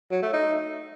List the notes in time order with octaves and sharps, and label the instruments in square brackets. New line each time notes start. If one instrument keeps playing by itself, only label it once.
[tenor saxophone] F#3
A3
D#4